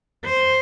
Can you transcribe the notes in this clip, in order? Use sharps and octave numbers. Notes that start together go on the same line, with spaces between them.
C5